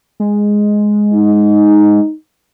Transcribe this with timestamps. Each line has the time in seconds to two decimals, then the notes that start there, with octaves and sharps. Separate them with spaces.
0.20 G#3
1.14 D#4